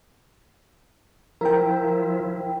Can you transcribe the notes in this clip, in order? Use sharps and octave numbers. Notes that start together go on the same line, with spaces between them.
F3 E4 A#4 G5